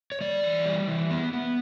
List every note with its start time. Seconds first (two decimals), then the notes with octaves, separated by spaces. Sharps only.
0.12 C#5
0.21 G3 D5
0.44 E3
0.66 G3
0.88 E3
1.11 B3
1.33 B3